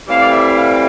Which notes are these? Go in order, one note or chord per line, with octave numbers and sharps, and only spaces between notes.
A2 E3 G3 C4 F5
D5
E5
F5